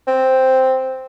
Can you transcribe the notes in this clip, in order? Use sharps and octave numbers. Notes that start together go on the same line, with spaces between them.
C4